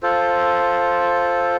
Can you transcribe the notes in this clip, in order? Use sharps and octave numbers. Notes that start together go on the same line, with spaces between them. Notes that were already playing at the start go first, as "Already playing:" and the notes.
F4 A4 C5